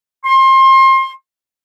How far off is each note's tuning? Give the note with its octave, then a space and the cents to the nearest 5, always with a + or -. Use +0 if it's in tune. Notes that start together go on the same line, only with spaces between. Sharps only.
C6 +30